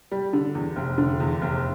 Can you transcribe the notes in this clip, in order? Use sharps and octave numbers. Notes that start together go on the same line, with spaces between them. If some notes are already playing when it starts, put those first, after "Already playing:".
G3
D3
E2
F1
D3
E2
F1